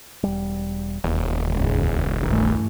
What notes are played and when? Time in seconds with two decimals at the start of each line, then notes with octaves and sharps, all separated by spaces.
0.23 E1 G3
1.04 E1 D#2
1.50 C#2 G#2
2.23 B1 G2 D#3 E3 A3